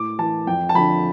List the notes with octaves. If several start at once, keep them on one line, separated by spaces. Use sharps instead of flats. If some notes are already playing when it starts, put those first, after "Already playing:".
Already playing: A2 D6
E3 A5
F2 G5
A5
D3 F3 B5